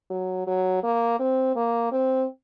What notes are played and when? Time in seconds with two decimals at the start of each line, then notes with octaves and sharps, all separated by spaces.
0.11 F#3
0.47 F#3
0.83 A#3
1.20 C4
1.56 A#3
1.92 C4